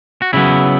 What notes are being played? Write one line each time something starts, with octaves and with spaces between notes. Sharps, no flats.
F#4
C#3 F#3 B3 E4